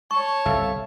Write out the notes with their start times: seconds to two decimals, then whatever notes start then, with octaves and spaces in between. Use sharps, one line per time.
0.11 C#5 A5 C#6
0.46 G1 C2 C3 A4 E5 F5